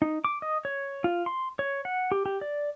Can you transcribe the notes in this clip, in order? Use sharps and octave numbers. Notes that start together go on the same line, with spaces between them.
D#4
D6
D#5
C#5
F4
C6
C#5
F#5
G4
G4
D5